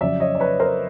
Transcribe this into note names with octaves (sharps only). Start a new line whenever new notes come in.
F2 C#3 F#3 D5 E5
C#5 D#5
D5
B4 C#5
A#4 C5